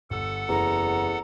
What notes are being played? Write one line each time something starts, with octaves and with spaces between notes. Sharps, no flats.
G1 A4 F#5 E6
F#1 E2 A#5